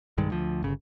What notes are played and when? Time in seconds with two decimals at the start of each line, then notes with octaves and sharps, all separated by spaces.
0.18 B1 G2 D#3 G#3
0.30 D2 F3
0.63 G1 C#3